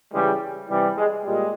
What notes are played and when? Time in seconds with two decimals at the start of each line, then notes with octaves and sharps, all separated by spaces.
0.11 C#3 E3 G3 G#3
0.68 C3 E3 G3
0.96 G#3
1.24 A#2 G3 G#3